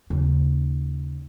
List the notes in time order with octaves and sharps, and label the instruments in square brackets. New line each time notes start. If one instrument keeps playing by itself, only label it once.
[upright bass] D#2 C#3